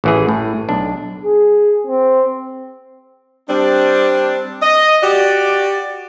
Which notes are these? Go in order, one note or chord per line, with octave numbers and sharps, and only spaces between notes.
A1 E3 G#4
A2
B1 D4
G#4
C4
G3 C4 D4
D#5
F#4 G4 D5